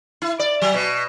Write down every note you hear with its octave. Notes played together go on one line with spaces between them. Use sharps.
E4
D5
F#3
B2